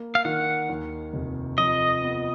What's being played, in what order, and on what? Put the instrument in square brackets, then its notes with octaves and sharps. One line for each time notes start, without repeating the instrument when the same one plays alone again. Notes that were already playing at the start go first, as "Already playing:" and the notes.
Already playing: [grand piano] A#3
[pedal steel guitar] F5
[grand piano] D#3 [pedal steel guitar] F#5
[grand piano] D#2
F1
[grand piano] F2 [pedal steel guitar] D#5
[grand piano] B3